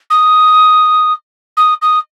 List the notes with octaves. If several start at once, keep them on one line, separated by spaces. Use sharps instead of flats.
D#6
D#6
D#6